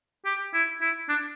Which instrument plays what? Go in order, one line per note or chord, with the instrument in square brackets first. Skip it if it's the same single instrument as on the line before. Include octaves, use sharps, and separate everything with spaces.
[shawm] G4
E4
E4
D4